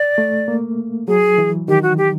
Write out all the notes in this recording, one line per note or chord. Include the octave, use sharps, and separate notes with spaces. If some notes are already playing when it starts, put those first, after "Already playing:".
Already playing: D5
A3
A#3
F#3 G#4
E3
D#3 G4
F#4
G4